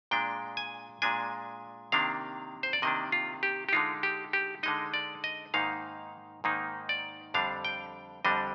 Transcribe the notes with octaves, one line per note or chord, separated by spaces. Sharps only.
A#2 G#3 D4 G5
G#5
A#2 G#3 D4 G#5
C3 D#3 A#3 D4 F5
C5
D5
C3 D#3 A#3 D4 D#5
F4
G4
G4
D3 G#3 D#4 F4
G4
G4
D3 G#3 D#4 D#5
D5
D#5
G#2 D#3 A#3 D#4 F5
G#2 D#3 A#3 D#4
D5
F2 D3 G3 D4 F5
G5
F2 D3 G3 D4 D#5